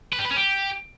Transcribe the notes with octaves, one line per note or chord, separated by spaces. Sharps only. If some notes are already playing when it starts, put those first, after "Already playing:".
B4
G4
B4
C#4
G4